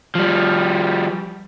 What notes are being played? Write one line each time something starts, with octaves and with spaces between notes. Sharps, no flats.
F3 G3